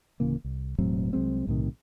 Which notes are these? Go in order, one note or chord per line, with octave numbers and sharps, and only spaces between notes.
D1 C#3 E3 A#3
C2
E1 A2 F#3 C4
C2 F#3 G#3 C4
B1 A2 C3 D#3